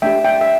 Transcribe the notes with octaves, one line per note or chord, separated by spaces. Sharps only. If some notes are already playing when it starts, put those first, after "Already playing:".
A3 D4 G4 E5 G5
E5 G5
E5